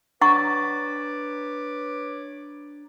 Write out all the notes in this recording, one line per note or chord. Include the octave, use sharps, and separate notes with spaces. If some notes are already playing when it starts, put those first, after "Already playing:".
D4 B4 C#5 F#5 A#5 C#6 D6 A6